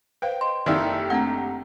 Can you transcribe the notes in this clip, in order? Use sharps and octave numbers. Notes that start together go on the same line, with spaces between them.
B4 C5 F5 G5
D#5 C6
F#1 D#3 E4 G4 A4 D5 F5
A3 C4 D4 F#5 A#5